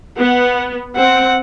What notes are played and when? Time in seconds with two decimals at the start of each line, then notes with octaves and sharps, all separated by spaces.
0.18 B3 F#5
0.96 C4 F#5